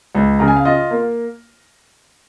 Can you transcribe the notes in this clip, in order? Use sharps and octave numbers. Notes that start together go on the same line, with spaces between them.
C#2
C#3 A#5
G#5
F5
F4 D#5
A#3